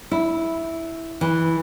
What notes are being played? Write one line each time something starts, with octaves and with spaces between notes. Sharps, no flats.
E4
E3